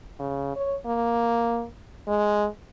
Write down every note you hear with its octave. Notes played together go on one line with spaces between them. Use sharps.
C#3
C#5
A#3
G#3